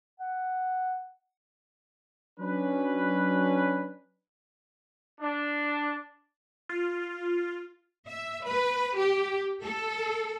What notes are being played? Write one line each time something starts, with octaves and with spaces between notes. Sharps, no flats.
F#5
F#3 C#4 D4 B4
D4
F4
E5
B4
G4
A4